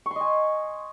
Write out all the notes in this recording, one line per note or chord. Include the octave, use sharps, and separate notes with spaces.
D#5 G#5 C6 C#6